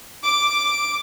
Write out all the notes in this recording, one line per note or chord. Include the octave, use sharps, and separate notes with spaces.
D6